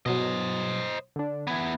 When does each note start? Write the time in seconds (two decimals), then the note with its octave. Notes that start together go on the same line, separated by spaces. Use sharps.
0.06 B2 F#3 C5 D#5
1.16 D3 D4
1.47 E3 B3 G#6